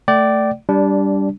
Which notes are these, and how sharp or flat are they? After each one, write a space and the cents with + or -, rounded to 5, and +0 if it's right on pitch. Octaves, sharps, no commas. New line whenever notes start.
A3 +5 D5 +0 G5 -35
G3 +0 D4 -15